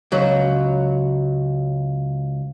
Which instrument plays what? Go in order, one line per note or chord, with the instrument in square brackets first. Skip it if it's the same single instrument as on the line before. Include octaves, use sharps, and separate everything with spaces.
[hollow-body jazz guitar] C#2 F#3